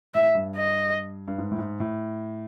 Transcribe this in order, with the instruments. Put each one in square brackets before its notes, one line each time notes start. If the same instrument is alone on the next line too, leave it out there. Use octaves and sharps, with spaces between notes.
[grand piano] A2 [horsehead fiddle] E5
[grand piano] G2
[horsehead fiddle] D#5
[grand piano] G2
G#2
A2
G#2
A2